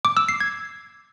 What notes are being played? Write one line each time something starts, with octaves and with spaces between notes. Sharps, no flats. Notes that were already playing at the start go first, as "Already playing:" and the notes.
D6
E6
C7
G#6